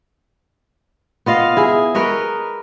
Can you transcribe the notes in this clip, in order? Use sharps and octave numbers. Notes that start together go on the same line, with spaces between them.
B3 F4 D#5 F5
E4 G#4
A#4 B4 C#5 D#5